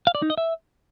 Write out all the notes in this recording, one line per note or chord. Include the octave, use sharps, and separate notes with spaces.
F5
D5
D#4
D#5
E5